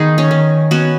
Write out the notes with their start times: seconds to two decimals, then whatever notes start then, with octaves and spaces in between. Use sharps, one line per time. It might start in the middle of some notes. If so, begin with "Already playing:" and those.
Already playing: D#3 B3 D#4 G#4
0.18 C#4
0.31 D#3
0.71 B3 C#4 F#4